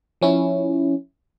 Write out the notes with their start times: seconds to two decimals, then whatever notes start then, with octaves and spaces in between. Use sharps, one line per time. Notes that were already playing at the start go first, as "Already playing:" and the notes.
0.21 F3 C#4 E4